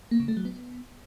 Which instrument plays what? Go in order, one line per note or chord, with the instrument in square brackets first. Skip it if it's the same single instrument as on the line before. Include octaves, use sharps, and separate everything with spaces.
[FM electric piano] A#3
C#3
A3
F#3
B3